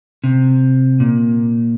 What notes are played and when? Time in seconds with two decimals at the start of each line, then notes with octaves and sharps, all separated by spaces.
0.24 C3
1.00 A#2